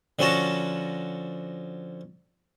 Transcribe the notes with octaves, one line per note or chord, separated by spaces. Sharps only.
D3 F3 C#4 F#4 A5 A#5